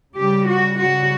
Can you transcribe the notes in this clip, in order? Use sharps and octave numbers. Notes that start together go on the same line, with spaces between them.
C#3 G3 G4
F#4
C#3 G3 F#4